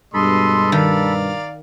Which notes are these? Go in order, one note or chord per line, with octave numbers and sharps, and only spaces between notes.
G2 B2 G#3 A4 D#5 B5 C6
D#3 A#4 D5 F5